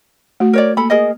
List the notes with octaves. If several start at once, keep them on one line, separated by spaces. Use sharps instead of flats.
A3 F#4
A#4 C#5 D5
A#3 A4 B5
G#4 A#4 D#5